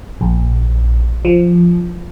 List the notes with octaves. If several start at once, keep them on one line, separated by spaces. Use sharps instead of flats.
A#1
F3